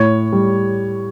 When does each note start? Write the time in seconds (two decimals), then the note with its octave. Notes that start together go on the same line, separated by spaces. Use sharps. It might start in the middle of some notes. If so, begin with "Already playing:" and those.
Already playing: A2 C#5
0.33 G3